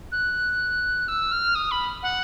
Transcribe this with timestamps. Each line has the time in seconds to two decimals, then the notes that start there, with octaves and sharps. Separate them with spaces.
0.11 F#6
1.08 E6
1.31 F6
1.55 D#6
1.71 B5
2.02 F#5